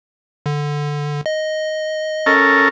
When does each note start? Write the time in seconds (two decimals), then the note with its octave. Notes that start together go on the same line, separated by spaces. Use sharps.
0.46 D3
1.26 D#5
2.26 C#4 A4 A#4